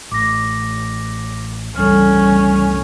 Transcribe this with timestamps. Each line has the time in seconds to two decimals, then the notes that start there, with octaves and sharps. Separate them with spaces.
0.12 A1 D6 A#6
1.75 C2 F#2 E3 G3 C#4 A4 F6